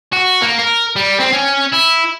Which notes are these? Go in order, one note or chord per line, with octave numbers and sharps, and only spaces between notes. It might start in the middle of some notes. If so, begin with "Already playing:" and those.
F#4
A#3
A#4
G3
C4
C#4
E4